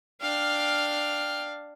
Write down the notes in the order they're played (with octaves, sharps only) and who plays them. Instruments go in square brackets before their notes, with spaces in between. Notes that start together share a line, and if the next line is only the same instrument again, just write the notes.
[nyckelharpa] D4 F5 [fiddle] G5 F6